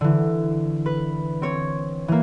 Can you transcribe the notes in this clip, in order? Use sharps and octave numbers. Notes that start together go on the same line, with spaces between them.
D3 E3
B4
C4 C#5
E3 A#3